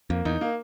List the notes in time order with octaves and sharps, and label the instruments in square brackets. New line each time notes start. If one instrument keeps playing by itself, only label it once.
[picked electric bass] F2 [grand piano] A#3
[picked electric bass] E2 [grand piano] D#4
[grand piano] A#3